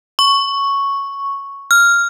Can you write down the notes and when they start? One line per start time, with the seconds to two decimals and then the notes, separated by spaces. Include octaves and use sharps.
0.19 C#6
1.71 F6